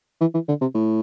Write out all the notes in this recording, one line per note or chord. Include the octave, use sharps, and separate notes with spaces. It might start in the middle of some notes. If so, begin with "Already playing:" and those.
E3
E3
D3
C3
A2